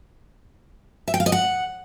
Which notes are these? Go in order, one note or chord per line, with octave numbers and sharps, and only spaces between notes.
E5
G5
F5
D#5
F#5